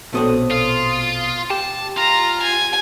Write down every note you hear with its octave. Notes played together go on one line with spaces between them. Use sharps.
A#1 B2 A3 C4 D4 D#6
F4
G4 A5
F4 A#5
G#5